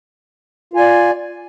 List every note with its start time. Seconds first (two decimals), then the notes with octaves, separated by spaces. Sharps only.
0.73 F4
0.76 G#5
0.79 D5